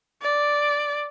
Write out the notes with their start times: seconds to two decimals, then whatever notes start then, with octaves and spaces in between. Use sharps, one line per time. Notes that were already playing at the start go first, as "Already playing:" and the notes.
0.22 D5